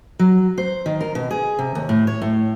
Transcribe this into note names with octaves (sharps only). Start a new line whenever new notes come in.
F#3
C5
D#3
A#4
B2
G#4
C3
D#2
A2
C#5
A2